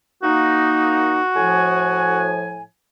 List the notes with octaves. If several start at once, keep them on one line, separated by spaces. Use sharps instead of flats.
A#3 D#4 F#4
A2 F3 G#5